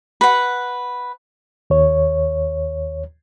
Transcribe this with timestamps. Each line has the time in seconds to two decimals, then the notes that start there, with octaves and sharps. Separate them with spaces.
0.21 B4 F#5
1.70 D#2 C#5